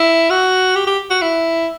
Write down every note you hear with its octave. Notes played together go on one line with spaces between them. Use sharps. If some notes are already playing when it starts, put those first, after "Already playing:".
Already playing: E4
F#4
G4
G4
F#4
E4